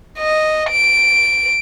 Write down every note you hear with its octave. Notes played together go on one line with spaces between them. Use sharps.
D#5
D7